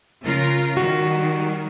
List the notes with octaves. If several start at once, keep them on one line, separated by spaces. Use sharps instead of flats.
C#3 F4 A#4
D#3 G3 F#4